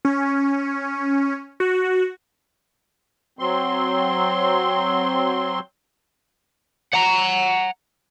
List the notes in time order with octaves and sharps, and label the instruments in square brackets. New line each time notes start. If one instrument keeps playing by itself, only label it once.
[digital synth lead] C#4
F#4
[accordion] F#3 C4 C6
[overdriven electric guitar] F#5 A#5